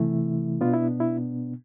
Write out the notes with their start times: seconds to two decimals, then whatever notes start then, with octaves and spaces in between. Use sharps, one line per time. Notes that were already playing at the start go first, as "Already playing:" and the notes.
Already playing: C3 E3 A3 E4
0.61 B2 B3 D4 F4
0.74 E4
1.00 E4